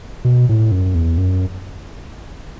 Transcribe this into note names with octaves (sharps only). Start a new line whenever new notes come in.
B2
A2
F#2
E2
F#2